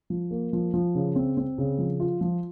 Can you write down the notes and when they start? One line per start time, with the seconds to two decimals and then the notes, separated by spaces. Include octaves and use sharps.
0.10 F3
0.31 A#3
0.53 F3
0.74 F3
0.95 C#3
1.16 C4
1.37 C4
1.58 C#3
1.78 F3
2.00 F4
2.21 F3